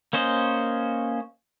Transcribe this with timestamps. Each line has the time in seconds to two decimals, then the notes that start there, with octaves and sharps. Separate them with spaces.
0.13 A#3 C#4 C5 D#5